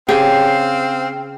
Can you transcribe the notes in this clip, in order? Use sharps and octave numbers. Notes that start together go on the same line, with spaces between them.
C#3 C4 G4 G#4 F5 G5